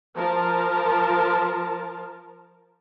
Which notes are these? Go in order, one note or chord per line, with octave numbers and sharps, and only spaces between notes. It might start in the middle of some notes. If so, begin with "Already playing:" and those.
F3 A#4 A5